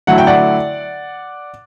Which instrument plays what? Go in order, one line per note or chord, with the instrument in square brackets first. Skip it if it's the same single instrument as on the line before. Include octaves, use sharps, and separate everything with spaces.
[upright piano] D3 F#3 A3 E4 F#5
G5
D5 F#5